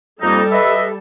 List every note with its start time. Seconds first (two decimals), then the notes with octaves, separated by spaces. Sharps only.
0.21 F2 G3 A#3 D#4 A4
0.51 B4 D#5 E5